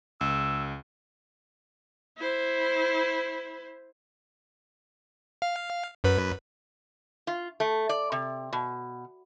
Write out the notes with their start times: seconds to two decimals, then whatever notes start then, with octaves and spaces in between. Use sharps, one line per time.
0.21 C#2 E6
2.18 E4 C5
5.42 F5
6.04 F#2 B4
7.27 F4
7.60 A3
7.89 D5
8.12 C3
8.53 B2